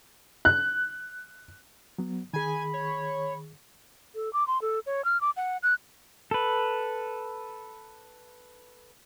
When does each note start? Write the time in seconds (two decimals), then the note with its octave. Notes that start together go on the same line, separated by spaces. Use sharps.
0.45 F#6
1.98 F#3 B3
2.33 D#3 G#4 G#5 B5
2.73 C#5
4.15 A4
4.33 D6
4.47 C6
4.62 A4
4.86 C#5
5.05 F6
5.21 D6
5.37 F#5
5.63 F#6
6.31 A4 B4